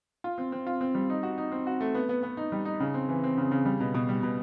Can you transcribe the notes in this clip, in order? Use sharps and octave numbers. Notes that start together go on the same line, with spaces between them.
F4
C4
C4
F4
C4
G3
D#4
F#4
D#4
C4
F#4
A3
B3
B3
B3
D#4
G3
D#4
C#3
C4
E3
C4
C#3
C#3
G3
B2
B2
G3
B2